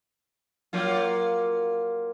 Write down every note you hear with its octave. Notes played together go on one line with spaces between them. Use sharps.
F#3 A#3 F4